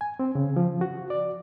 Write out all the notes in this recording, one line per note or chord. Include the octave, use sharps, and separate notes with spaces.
G#5
C4
C#3
F3
F#4
D5